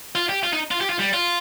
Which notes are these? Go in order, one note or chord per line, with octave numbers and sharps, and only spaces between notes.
F4
G4
F4
D#4
F4
G4
F4
G3
F4